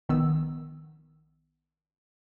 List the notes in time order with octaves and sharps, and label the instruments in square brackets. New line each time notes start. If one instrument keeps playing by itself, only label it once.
[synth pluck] A#1 D#3 B3 E6